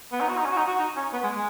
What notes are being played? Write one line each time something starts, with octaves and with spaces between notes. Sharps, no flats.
B3
D#4
F#4
D#4
C#4
F#4
D#4
F#4
D#4
C#4
B3
G#3
G#3